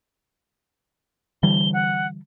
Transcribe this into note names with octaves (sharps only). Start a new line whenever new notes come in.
D3 E3 G3 G7
F#5